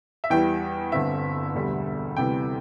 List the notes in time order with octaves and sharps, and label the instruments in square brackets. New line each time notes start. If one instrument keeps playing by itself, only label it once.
[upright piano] E5
E2 E3 G3 E4 G5
G1 G2 D3 C4 E5
E1 D2 D3 G3
D2 C3 E3 G3 G5